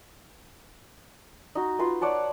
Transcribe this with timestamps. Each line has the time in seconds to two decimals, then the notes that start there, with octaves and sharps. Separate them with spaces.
1.55 D#4 F#4
1.79 F4 B4 C6
2.01 C#5 D5 F#5 A5